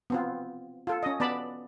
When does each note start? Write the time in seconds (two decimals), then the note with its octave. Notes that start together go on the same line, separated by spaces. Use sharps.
0.10 B3 C4 F4
0.87 F4 A4
1.03 C#4 D#5
1.20 B3 D5 A5 B5